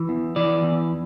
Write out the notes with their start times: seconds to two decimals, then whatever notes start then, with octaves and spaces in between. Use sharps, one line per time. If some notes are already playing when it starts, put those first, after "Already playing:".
Already playing: E3
0.09 E2
0.36 E3 D5
0.63 E2